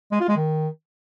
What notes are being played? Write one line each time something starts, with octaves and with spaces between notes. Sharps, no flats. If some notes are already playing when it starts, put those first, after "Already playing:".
G#3
F4
G#3
D#3